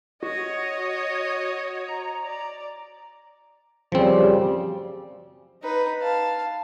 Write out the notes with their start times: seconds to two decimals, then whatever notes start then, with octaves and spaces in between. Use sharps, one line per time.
0.23 F#4 C#5 D#5
1.88 A#5
2.23 D5
3.92 F#2 C#3 F3 G3 C4
5.63 D#4 B4
6.01 F5 A5